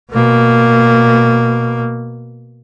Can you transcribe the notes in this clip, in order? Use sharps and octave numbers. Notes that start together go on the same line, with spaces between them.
B2 A#3